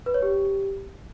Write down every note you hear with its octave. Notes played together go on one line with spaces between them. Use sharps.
B4
C#5
G4